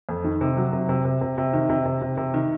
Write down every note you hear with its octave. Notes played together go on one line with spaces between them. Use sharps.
F2
D#3
C3
F#3
C3
C3
C3
C3
C3
D#3
C3
C3
C3
C3
D#3